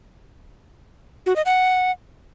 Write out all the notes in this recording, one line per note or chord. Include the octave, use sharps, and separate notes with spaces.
F#4
D#5
F#5